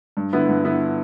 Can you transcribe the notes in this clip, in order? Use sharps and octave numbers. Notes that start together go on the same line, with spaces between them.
G2
D3 B3 E4
G2
D3 B3 E4